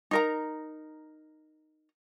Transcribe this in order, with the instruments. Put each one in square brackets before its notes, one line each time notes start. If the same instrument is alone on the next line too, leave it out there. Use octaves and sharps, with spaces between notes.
[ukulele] D#4 A#4 A#5